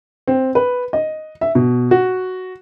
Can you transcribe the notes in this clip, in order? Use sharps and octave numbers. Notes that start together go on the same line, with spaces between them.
C4
B4
D#5
E5
B2
F#4